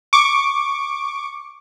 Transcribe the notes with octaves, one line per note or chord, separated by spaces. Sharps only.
C#6 D6